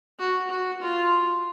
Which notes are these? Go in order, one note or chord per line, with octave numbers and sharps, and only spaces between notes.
F#4
F#4
F4